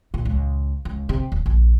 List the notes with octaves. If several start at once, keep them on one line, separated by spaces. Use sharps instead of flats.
A#2
C#2
C#2
C3
D#1
A#1